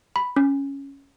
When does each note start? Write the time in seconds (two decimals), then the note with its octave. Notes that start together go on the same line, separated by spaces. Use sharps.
0.16 B5
0.36 C#4